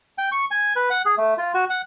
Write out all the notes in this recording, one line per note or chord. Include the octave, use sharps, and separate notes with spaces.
G5
C#6
G#5
B4
F#5
G#4
A3
F4
F#4
F#5